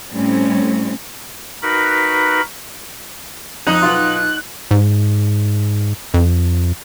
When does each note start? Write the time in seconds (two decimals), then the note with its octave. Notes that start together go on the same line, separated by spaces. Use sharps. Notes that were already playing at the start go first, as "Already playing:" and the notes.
0.12 A2 G3 C4 C#4
1.62 D#4 F#4 A#4 B4 B5
3.67 F2 D#4 F#6
3.82 B1 F4 C6
4.71 G#2
6.14 F2